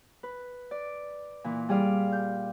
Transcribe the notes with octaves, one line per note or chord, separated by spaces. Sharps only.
B4
D5
A#2 E3
G3 G#4 D5 F5
G6